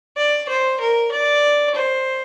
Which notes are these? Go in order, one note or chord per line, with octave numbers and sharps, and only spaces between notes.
D5
C5
A#4
D5
C5